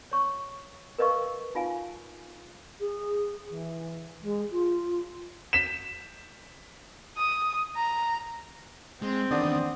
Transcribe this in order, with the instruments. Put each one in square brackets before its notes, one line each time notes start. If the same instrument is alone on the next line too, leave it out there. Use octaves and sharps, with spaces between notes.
[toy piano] C#5 C#6
A#4 B4 D#5 F5 C#6 E6
D#4 F4 F5 G#5
[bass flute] G#4
E3
G#3
F4
[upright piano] B6 E7
[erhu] D#6
A#5
[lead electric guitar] G#3 [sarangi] C4
[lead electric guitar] E2 D#3 [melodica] B3 D5 D#6 [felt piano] D4